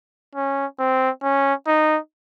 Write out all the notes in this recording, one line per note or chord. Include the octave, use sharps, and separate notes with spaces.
C#4
C4
C#4
D#4